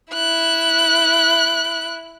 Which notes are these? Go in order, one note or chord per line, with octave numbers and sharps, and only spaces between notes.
E4 F#6